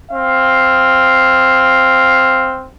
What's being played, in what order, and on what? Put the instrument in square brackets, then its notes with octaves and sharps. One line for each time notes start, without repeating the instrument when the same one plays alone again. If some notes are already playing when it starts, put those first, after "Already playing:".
[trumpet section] C4 F5